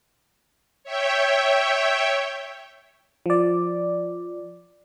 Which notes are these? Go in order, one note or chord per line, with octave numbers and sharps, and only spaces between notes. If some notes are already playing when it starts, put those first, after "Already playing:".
C#5 E5 G5
F3 D5